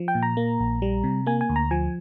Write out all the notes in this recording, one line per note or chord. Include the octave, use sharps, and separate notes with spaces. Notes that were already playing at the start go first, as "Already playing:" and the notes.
Already playing: F3
G5
A#2
A#5
A#3
A#1
G3
C3
A#3 G#5
G#5
D2
A#5
F3 G#5